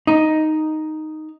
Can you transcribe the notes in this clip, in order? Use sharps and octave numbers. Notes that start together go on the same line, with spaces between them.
D#4